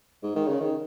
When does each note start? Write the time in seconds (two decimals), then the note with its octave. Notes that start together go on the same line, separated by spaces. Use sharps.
0.23 G#2
0.36 D#3
0.48 C#3
0.60 D#3